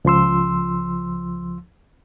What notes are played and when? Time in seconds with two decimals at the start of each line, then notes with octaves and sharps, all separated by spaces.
0.05 C#2 F3 C6 E6